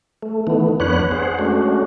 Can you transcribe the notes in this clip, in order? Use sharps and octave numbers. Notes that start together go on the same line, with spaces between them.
A3
D#3 E3 A3 B3
F2 B3 D4 B4 C#5 F#6
G#4 C5 F#5
G#3 A3 C#4 D4 F#4